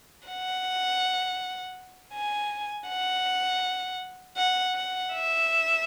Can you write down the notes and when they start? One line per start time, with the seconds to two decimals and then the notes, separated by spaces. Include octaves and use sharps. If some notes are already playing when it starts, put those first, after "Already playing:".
0.28 F#5
2.14 G#5
2.88 F#5
4.37 F#5
4.75 F#5
5.13 E5